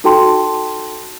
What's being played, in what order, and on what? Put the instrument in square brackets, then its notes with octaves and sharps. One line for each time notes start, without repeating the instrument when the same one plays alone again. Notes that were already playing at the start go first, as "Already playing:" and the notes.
[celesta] D#4 F#4 A4 G5 A5 C6